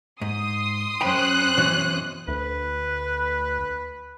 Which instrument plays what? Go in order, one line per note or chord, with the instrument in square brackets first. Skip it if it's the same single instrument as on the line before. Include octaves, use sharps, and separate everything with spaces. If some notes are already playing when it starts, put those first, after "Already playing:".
[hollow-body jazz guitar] G#2 [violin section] C6 D#6
[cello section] F#2 C#4 C5 [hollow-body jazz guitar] G5 B5 [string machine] F#6
[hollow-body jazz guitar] B2 E3
[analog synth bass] D2 [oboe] B4